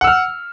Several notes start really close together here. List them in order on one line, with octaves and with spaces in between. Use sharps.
F#5 E6 F6